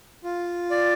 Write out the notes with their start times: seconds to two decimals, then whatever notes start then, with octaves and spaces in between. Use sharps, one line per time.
0.24 F4
0.70 D5